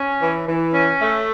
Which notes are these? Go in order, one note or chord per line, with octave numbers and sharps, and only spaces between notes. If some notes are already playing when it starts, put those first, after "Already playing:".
Already playing: C#4
E3
E3
C#4
A3